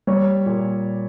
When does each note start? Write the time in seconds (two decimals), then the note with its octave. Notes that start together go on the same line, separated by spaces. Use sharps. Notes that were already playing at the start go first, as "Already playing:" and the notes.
0.07 G3 C#5
0.46 A#2